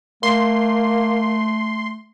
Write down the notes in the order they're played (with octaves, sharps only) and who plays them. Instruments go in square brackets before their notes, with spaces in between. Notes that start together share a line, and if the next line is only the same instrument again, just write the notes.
[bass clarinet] A3 [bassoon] A#3 [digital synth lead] C6